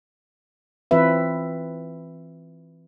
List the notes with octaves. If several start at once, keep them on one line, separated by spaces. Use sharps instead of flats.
E3 C4 F4 B4 E5